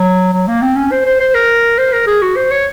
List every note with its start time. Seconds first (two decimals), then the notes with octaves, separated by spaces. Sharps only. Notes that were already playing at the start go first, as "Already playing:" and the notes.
Already playing: F#3
0.33 F#3
0.47 A#3
0.62 C4
0.76 C#4
0.91 C5
1.06 C5
1.20 C5
1.35 A#4
1.78 C5
1.93 A#4
2.07 G#4
2.22 F#4
2.36 C5
2.51 C#5